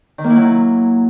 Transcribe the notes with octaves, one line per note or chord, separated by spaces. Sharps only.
D#3
A#3
E4
F#3